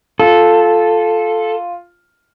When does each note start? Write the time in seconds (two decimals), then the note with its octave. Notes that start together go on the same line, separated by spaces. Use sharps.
0.20 F4 A4